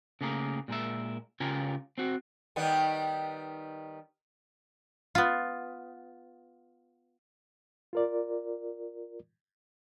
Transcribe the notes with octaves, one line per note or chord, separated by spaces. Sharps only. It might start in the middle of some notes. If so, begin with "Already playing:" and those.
C#3 A3 A#3 G#4 A#4
A#2 G#3 A#4 E5
C#2 C#3 F4 G4 A#4 G#5
C4 F#4
D#3 G3 B3
B3 F4
F4 A#4 D5